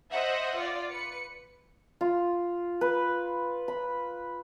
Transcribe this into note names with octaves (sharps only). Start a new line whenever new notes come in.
C5 D#5 E5 F#5
F4 D5
B4 C#7
F4
B4
B5